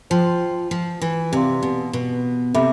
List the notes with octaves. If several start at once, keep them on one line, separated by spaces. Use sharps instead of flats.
F3 C5 G5 C6
F3
E3
C3 G4 D5 F5 C6
B2
B2
C3 A4 E5 B5 D6